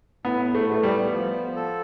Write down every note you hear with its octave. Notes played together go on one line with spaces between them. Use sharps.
A2 B3
A3
A3 B3
G3
F3
A4